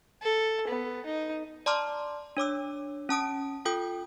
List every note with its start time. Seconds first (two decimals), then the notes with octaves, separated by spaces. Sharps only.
0.23 A4
0.68 B3
1.06 D#4
1.66 D5 A5 A#5 C6 D6 F6
2.37 D4 C#5 D6 E6
3.09 C#4 A5 D#6 D7
3.65 F4 A4 G5 D#6 G6